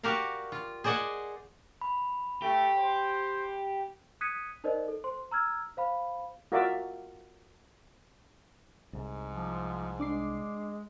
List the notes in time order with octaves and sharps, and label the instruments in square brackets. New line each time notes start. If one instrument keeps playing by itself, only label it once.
[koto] F#4 G4 A#4 D5 F5
F4
G#4 C5 D5 D#5 F#5 G#5
[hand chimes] B5
[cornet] A3 [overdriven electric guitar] G4
[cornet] C5
[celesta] D#6 F#6 G#6 B6 C#7 D#7
D#4 A#4 C5 D5 D#5
A4
C5 C6
A#5 E6 F6 G#6
C5 F5 B5
[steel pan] F4 F#4 A#4 D5 E5
[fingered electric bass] C2 [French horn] G#2
[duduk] F3
[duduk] G#3 [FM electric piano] D4 D6 C7